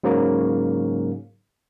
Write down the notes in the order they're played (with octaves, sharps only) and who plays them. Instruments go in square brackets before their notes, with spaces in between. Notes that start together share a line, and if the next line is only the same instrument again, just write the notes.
[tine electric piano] G#2 C#3 F#3 A#3